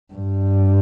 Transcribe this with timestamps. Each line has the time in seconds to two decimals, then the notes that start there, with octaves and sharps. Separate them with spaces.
0.13 G2